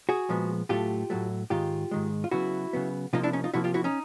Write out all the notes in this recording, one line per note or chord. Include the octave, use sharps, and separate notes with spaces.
F#4 G#4
A#2 F3 G#3 B3
A2 F#3 A3 F4 G4
A2 F#3 A3
G#2 D#3 G#3 F4 G4
G#2 D#3 G#3
F4
C#3 F#3 B3 E4 F#4
C#3 F#3 B3
C3 F3 A#3 D#4 F4
D4 E4
C#4 D#4
D#4 F4
C3 F3 A#3 E4 F#4
F4 G4
E4 F#4
C#4 D#4